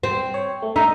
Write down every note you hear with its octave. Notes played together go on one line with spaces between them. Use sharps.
C4
C#5
A3
D#4 E5 A#5